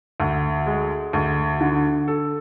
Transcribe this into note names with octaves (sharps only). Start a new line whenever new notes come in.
D2
G#3
D2
D3
A4